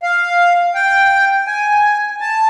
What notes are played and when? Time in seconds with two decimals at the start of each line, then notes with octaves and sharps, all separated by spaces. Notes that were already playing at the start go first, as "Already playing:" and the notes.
0.03 F5
0.74 G5
1.47 G#5
2.20 A5